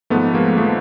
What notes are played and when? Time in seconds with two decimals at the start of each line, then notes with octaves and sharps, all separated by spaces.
0.10 G#2 F3 A3 B3
0.35 G#3 A#3
0.57 F3 A3 B3